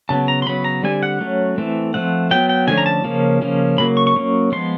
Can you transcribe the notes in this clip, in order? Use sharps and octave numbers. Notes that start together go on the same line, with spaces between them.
C#3 F#3 B3 A5
A#5
C6
C#3 F#3 B3 B5
A#5
D3 G3 C4 G#5
F#5
F#3 A3 C#4
E3 A3 C4
F3 A3 C4 F#5
F#3 B3 G5
G5
D3 F3 A3 C#4 G#5
A#5
A5
C#3 F3 A#3 C#4
C#3 F3 A#3 C#4
C#3 F#3 A#3 B5
C#6
C#6
F#3 A#3 C#4
F3 G#3 B3 C6